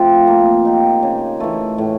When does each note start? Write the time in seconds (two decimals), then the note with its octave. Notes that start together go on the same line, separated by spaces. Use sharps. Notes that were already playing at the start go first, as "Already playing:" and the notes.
Already playing: F3 A3 C4 F4
0.27 A#3
0.65 D#4 G4
1.03 C#3
1.40 E3 A3
1.78 A2